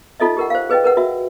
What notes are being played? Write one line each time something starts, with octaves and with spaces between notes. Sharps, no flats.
D#4 F4 A4 D#5 E5
G4 A#4 F#5
C5 F5
G#4 B4 D#5 G5
A#4 B4 F#5
F#4 E5